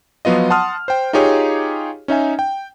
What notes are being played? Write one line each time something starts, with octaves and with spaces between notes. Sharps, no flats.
F3 F#3 B3 F4 D#5
F#5 A5 C6 D#6 F6
C5 G5
D#4 F4 G4 G#4 C#5 F5
C#4 D#4 E5 G#5
G5